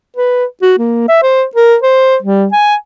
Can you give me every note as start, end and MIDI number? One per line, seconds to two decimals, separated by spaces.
0.16 0.45 71
0.62 0.74 66
0.78 1.07 58
1.08 1.20 76
1.22 1.44 72
1.55 1.76 70
1.82 2.16 72
2.22 2.47 55
2.52 2.75 80